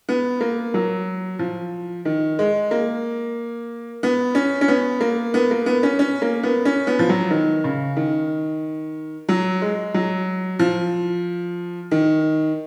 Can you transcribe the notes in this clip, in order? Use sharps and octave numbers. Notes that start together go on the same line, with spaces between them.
B3
A#3
F#3
F3
D#3
G#3
A#3
B3
C#4
C#4
B3
A#3
B3
A#3
B3
C#4
C#4
A#3
B3
C#4
B3
F3
F#3
D#3
C#3
D#3
F#3
G#3
F#3
F3
D#3